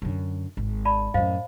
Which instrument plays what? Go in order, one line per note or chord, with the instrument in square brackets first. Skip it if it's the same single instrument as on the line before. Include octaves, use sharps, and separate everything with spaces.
[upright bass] F#2 D3
G#1
[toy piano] D5 A5 B5
[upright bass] F#2 A2 [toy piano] C5 D#5 F5